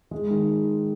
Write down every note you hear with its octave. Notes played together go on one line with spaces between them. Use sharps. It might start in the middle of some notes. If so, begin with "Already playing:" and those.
G#3
D#3